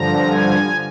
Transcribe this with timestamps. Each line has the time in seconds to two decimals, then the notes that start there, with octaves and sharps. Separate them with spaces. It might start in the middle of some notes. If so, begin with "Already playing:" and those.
Already playing: G2 D3 F3 A#5
0.28 G#5